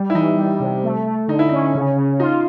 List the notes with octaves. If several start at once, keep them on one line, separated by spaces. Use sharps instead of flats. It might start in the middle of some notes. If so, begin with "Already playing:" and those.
Already playing: G3
E4
E3 D#4
G3
C3
A3
A3
D3 D#4
E4
C#4 D#4
C#3
C#3
D#4 F4